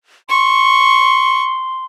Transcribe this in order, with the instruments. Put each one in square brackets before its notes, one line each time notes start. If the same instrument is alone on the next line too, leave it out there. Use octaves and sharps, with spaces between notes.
[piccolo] C6 [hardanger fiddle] C#6